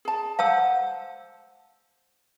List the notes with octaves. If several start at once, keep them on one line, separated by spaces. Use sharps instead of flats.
G#4 A5
C5 F5 F#5 A5 E6